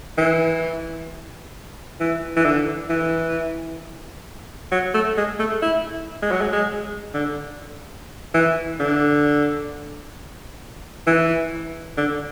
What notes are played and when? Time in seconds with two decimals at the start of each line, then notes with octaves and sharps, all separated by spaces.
0.18 E3
2.00 E3
2.36 E3
2.45 D3
2.90 E3
4.72 F#3
4.94 A3
5.17 G#3
5.39 A3
5.62 E4
6.22 G#3
6.31 F#3
6.41 G#3
6.53 G#3
7.14 D3
8.34 E3
8.80 D3
11.07 E3
11.97 D3